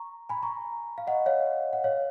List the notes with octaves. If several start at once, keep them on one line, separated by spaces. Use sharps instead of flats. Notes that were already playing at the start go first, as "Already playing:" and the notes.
Already playing: A#5 C#6
G#5 B5
A#5 C#6
F5
D#5 F#5
C#5 F5
F#5
C#5 F5